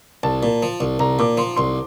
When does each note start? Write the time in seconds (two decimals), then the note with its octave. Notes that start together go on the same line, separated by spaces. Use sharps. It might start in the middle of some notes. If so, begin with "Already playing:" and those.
0.23 C2 A5
0.43 A#2
0.63 F3
0.80 C2
0.99 C2 A#5
1.19 A#2 D6
1.37 F3 C6
1.56 C2 C6